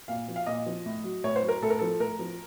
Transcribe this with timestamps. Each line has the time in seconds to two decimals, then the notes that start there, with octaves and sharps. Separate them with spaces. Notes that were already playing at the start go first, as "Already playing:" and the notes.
0.08 A#2 F5
0.28 F3
0.36 F5
0.46 A#2 D#5
0.66 F3
0.86 A2
1.04 F#3
1.24 A2 C#5
1.36 C5
1.42 F#3
1.48 A#4
1.62 A2 A4
1.70 A#4
1.79 F3 A4
2.00 A2 A#4
2.19 F3